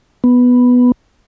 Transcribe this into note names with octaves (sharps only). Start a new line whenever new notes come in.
B3